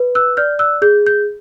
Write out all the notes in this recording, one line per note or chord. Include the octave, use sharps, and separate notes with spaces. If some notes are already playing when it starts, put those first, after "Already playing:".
Already playing: B4
E6 F#6
D5 F6 G6
E6 F#6
G#4 G6
G6